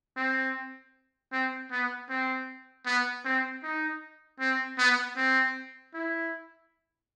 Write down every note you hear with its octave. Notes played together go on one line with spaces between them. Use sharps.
C4
C4
B3
C4
B3
C4
D#4
C4
B3
C4
E4